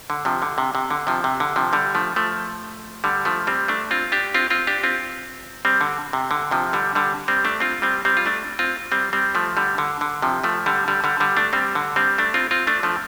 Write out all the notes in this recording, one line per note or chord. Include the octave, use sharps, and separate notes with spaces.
D3
C3 F3
D3
C3
C3
D3
C3 F3
C3
D3
C3 F3
D3 G3
F3 A3
F3 A3
D3 G3
F3 A3
G3 C4
A3 D4
C4 F4
D4 G4
C4 F4
C4 F4
D4 G4
C4 F4
G3 C4
D3
C3
D3
C3 F3
D3 G3
D3 G3
G3 C4
A3 D4
C4 F4
G3 C4
G3 C4
F4
A3 D4
C4 F4
G3 C4
G3 C4
F3 A3
D3 G3
D3
D3
C3 F3
F3 A3
D3 G3
D3 G3
D3 G3
D3 G3
A3 D4
G3 C4
D3
G3 C4
A3 D4
C4 F4
C4 F4
A3 D4
F3 A3